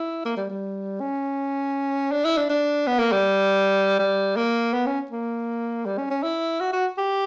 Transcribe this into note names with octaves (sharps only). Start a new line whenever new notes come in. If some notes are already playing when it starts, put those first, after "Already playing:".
Already playing: E4
A#3
G3
G3
C#4
D4
E4
D4
D4
B3
A#3
G3
G3
A#3
B3
C#4
A#3
G3
C#4
C#4
E4
F#4
F#4
G4